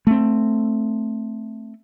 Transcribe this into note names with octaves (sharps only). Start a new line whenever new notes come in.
A3 C4